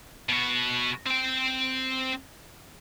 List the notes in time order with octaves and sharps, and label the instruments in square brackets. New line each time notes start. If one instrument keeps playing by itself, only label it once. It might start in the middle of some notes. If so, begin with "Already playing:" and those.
[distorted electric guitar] B2 F#4
C4 G5